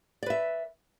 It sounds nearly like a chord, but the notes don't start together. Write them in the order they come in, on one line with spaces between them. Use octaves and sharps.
D5 B4 E5